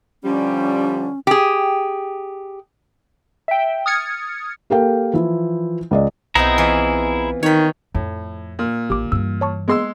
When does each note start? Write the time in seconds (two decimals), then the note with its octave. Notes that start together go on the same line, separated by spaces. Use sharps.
0.24 D3 F3 G3 C#4
1.27 G4 G#4
3.48 E5 G5
3.86 D#6 F6 G#6 A6 C#7
4.70 A#3 G4 A4 A#4 F5 G5
5.14 E3 F3 E4
5.91 C#2 D5 D#5
6.35 B1 B3 C4 D#4 E4 G#4 A#5
6.58 E3 F4
7.43 D#3 D#4 C#5 B5
7.95 F2 A2
8.59 A#2
8.90 A1 G4 D6
9.12 G2 E3 E6
9.41 C#5 A5 C#6
9.68 G#3 A#3 B3 G#4 C6 E6